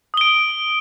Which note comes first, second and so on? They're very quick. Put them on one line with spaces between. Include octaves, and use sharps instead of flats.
D#6 G7 D7